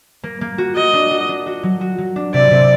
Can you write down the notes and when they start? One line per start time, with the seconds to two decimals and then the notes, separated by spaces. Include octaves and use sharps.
0.23 A#3
0.41 A#3
0.58 F#4
0.76 F#4 D#5
0.93 D4
1.11 F#4
1.29 D4
1.46 F#4
1.63 F#3
1.81 F#4
1.98 F#3
2.16 D4
2.34 C3 D5
2.51 C3